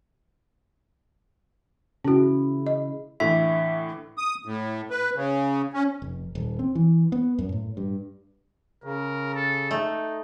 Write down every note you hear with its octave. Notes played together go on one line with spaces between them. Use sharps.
C#3 C#4 E4 F#4
D#5
A2 D3 E3 E5
D#6
A2
B4
C#3
C#4
F1
D#1
C4
E3
B3
F#2
A2
G2
C#3 A#4
A4
A3 D#4